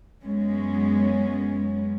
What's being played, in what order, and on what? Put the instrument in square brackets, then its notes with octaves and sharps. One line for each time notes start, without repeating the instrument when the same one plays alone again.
[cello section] F#2 G#3 B3 C#4